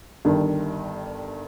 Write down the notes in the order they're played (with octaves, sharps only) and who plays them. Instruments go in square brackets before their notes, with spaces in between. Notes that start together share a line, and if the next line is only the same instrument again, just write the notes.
[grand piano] G1 G2 D#3